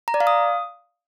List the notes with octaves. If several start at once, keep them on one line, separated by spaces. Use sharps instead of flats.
A#5
D5
F5
D#6